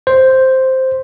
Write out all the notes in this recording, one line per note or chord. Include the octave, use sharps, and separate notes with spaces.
C5